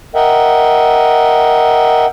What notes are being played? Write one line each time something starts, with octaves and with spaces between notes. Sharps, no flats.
A#4 D#5 E5 F#5 G5